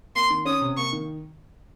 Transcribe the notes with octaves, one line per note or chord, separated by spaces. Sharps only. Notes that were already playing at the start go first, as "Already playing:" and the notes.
A#3 C6
D#3
C#4 D#6
C3
A#3 C#6
D#3